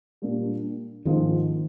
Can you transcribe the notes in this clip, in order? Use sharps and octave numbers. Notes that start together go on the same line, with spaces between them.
A#2 G3 A#3 D4
G#2 D#3 F3 A#3 D#4